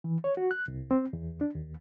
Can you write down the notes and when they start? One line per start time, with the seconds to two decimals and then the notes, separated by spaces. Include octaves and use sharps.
0.04 E3
0.24 C#5
0.37 F#4
0.51 F#6
0.68 C2
0.91 C4
1.13 E2
1.41 D4
1.55 D#2